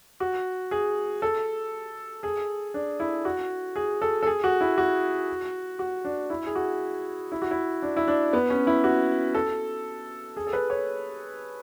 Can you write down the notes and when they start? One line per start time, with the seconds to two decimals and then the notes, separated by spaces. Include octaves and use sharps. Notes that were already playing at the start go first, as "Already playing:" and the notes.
0.20 F#4
0.71 G#4
1.22 A4
2.23 G#4
2.74 D4
3.00 E4
3.25 F#4
3.76 G#4
4.02 A4
4.23 A4
4.27 G#4
4.44 F#4
4.61 E4
4.78 F#4
5.79 F#4
6.05 D4
6.30 E4
6.46 G#4
6.55 F#4
7.32 E4
7.42 F#4
7.51 E4
7.82 D4
7.97 E4
8.08 D4
8.33 B3
8.50 C#4
8.67 E4
8.84 F#4
9.34 A4
10.36 G#4
10.47 A4
10.53 B4
10.70 C#5